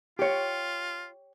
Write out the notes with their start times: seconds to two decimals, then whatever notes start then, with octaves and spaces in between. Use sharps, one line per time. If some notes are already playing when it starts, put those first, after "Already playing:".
0.19 F4 G4 C#5